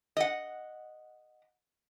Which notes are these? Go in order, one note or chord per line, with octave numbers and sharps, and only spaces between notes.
D#5 F#5